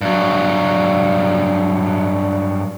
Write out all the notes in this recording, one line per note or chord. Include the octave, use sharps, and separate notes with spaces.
G2 F#3